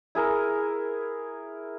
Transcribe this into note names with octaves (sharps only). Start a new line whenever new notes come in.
E4 G#4 A#4